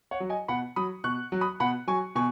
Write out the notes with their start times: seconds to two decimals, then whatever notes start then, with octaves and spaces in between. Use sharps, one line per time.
0.11 C#5 F#5
0.20 F#3
0.29 D#5 G#5
0.48 B2 F#5 B5
0.76 F#3 B5 D#6
1.04 B2 C#6 F#6
1.32 F#3
1.41 B5 D#6
1.60 B2 F#5 B5
1.87 F#3 G#5 C#6
2.15 B2 G#5 C#6